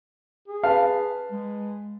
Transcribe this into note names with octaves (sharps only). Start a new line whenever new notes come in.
G#4
B4 F5 A5
G#3